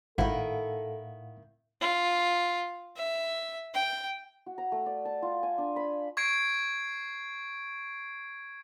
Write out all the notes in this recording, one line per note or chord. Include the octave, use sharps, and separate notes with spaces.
G#1 A2 D#3 E4 A4 F5 F#5
F4
E5
G5
F#4
A#5
A3
D5
A5
F4
G#5
D4
B5
C#6 G#6 C7 D7